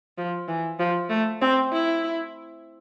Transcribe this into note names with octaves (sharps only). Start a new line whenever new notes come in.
F3
E3
F3
A3
C4
E4